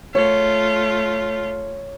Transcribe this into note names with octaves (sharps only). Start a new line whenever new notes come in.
A3 F4 C#5